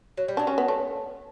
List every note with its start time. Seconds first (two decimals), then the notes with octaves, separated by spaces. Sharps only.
0.17 F#3
0.28 G3
0.37 F#3 D4
0.47 C#4
0.58 B3
0.68 A3